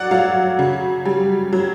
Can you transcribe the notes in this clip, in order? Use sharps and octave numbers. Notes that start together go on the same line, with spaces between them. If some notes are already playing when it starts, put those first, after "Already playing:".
Already playing: F#3 D5 F#5
F#3 F5
C#3
G3
F#3